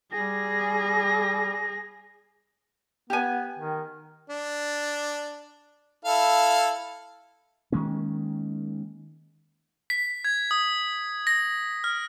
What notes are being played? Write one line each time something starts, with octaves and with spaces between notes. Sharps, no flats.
G3 G#4 A#6
B3 G4 G#5
D#3
D4
E4 A4 F5
D#3 G#3 A#3 C#4
B6
G#6
D#6
A#6
F6